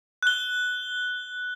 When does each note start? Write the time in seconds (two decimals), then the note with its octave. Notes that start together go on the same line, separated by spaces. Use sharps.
0.23 F#6 G7